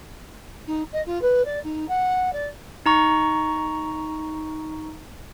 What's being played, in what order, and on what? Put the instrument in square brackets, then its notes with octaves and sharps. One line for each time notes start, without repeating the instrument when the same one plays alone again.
[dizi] D#4
D#5
F4
B4
D5
D#4
F#5
D5
[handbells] D#4 A#5 C#6